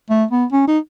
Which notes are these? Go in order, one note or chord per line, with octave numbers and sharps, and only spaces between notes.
A3
B3
C#4
D#4